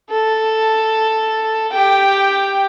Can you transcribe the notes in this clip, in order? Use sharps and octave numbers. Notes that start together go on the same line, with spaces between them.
A4
G4 G5